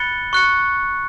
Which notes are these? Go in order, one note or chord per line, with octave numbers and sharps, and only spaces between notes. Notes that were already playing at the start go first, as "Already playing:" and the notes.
Already playing: B5 F#6 A6 C#7 G7
C#6 F#6 C#7